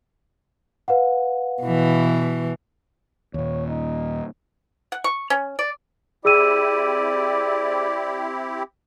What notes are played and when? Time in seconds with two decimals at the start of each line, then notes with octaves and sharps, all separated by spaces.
0.88 B4 F5 F#5
1.62 B2 E3
3.34 D#2 A#2 C#5
3.68 D#4
4.92 F#5
5.04 C#6
5.30 C#4
5.59 D5
6.25 C4 E4 G4 G#4 D5 E6 D#7